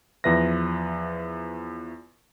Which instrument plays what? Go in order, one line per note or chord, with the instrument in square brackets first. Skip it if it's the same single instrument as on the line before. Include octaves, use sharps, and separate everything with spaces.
[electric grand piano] E2 F3 B4 E5 A#6